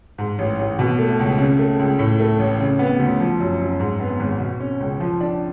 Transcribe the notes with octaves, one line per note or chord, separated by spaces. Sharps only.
G#2
A1
A1
B2
A3
C#2
C#3
A3
C#2
A2
A3
A1
C#3
B3
D2
F3
F#2
F#2
G#2
B3
G#1
B2
C#4
C#2
F3
D4